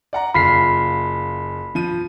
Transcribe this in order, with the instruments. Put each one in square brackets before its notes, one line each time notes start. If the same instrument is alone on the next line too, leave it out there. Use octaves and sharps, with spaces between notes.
[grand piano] D5 F#5 A#5
[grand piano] F#1 F4 [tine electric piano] B5 B6 C7
[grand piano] F3 D#7